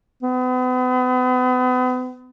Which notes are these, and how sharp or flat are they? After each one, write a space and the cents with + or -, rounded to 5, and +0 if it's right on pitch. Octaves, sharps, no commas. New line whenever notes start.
B3 +40